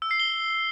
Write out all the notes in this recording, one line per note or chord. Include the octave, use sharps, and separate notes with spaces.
E6
C7
G7